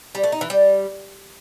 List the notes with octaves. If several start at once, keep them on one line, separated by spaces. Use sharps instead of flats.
G3
A3
D#4
E3
G3